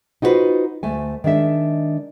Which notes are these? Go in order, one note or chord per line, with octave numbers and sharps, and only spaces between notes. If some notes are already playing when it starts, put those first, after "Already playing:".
D#4 F4 F#4 G#4 B4 C5
D2 A3 G#5
D#3 G#3 D4 E5